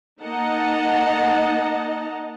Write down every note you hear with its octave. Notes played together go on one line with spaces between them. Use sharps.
A#3 D#4 D#5 F#5 A5 A#5